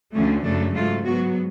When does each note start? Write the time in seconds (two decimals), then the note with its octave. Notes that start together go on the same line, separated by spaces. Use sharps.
0.14 D2 D3 F3 A3 C#4
0.44 F#2 C#3 F3 A3 D4
0.75 G#2 F#3 A3 F4
1.06 G#2 F#3 B3 F#4